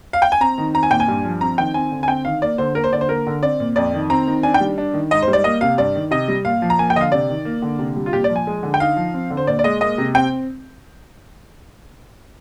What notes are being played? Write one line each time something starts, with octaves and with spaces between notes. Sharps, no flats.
F5
G5
G#5
C4 A#5
D#3
C4 A#5
G#5
A#2 G5
G#5
G2
F3
C4 A#5
D#3 G5
C4 G#5
D3
G#5
C4 G5
D#3 F5
A#3 D5
D3 C5
A#3 A#4
C5
D3 D5
C5
A#3 A#4
D3
C4 D5
A#2
F2 D5
D#3
C4 A#5
D#3
D4 G#5
G5
G3
D4
D#3
G#2 D#5
C5
G3
D5
A#3 D#5
C3 F5
G2 D5
D#3
C3 D#5
G3
A#2 F5
F3
A#5
A#3 G#5
G5
D3 D#5
F5
C3 D5
D#3
A#3
D3
C3
G3
F4
A#2 G4
D5
F3
G#5
G#3
D3
G5
D#4 F5
F3
C4
D3
C5
A#2 D5
D5
G#3 D#5
A#3 D#5
C3
C4 G5